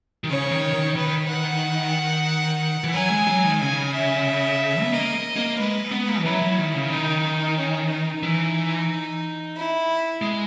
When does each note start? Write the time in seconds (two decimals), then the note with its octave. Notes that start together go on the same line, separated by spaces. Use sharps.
0.24 D#3
0.30 C#3 C#5
0.51 D#3
0.73 D#3
0.95 D#3 B4
1.29 F#5
2.84 E3
2.94 F#3 G#5
3.10 G#3
3.27 F#3
3.44 D#3
3.60 C#3 G#5
3.93 E5
4.82 B3
4.92 A#3 D#5
5.36 A#3
5.59 G#3 B4
5.92 B3
6.08 A#3
6.19 E3
6.25 F#3 E4
6.42 F#3
6.59 D#3
6.74 C#3
6.91 D#3 D#4
7.58 C#4
7.91 D#4
8.23 E3
9.56 E4
10.22 G#3